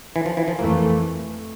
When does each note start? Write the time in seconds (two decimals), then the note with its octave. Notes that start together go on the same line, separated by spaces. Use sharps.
0.16 E3
0.26 F3
0.37 E3
0.48 F3
0.59 F2 E3 A3 A#3